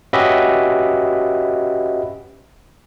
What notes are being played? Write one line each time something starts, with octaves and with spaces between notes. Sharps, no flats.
C#4 F#4 G4 B4 D#5 E5